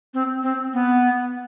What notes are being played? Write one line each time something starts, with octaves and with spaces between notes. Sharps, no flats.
C4
C4
B3